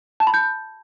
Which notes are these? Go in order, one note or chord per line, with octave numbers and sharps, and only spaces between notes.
A5
B5
G6